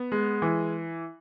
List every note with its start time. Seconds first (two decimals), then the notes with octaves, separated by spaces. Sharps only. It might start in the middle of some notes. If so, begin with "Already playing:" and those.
Already playing: B3
0.12 G#3
0.42 E3